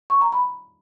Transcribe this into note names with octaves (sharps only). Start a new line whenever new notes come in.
C#6
A#5
B5